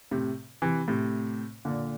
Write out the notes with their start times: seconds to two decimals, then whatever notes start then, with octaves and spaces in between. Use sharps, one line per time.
0.11 A2 C3
0.62 C3 E3
0.88 A2 C3
1.65 A#2 D3